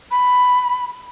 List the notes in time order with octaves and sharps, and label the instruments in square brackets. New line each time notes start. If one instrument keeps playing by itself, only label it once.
[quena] B5